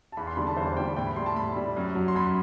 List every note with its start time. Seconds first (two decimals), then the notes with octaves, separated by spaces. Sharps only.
0.12 A5
0.17 E2 B5
0.27 C6
0.37 D3 G3 B5
0.47 A5
0.57 E2 C5
0.67 C5
0.77 D3 G3 G5
0.96 A2 G5
1.07 B5
1.16 G3 C6
1.26 A5
1.36 A2 B5
1.56 G3
1.77 F#2
1.95 F#3
2.08 C6
2.15 F#2 B5